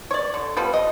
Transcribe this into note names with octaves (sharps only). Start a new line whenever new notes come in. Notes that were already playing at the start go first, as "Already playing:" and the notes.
C#5 D5
D3
F3 G3 B3
D#5